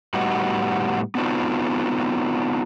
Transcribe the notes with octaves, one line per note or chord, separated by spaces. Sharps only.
A2 G3 B3 D#4 F#4
B3 C4 D4 D#4 F4 F#4